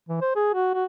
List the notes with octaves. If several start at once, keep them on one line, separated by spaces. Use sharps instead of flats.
E3
C5
G#4
F#4
F#4